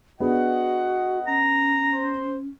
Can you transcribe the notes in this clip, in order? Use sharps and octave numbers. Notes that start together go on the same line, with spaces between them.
B3 D4 F#4 G#4 D#5 F#5
C#4 A#5
C5